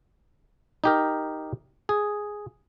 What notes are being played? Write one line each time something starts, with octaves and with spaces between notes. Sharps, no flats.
D#4 G4 A#4
G#4